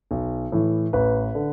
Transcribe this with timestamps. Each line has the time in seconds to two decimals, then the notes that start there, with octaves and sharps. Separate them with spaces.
0.11 B1
0.52 A2 E3
0.93 A1 B4
1.35 D3